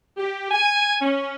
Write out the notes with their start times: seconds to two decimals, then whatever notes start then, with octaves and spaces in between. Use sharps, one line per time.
0.17 G4
0.50 G#5
1.02 C#4